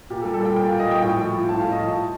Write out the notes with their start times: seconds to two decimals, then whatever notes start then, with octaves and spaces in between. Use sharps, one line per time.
0.10 A#2 G4
0.22 A4
0.25 G3
0.34 A4
0.41 G3 G5
0.56 A#2 G5
0.68 A#2 F5
0.79 D#5
0.87 G3 G5
1.02 A2 G5
1.18 F3
1.33 F3
1.48 A2 A5
1.60 A2 F5
1.71 D#5
1.80 F3 A5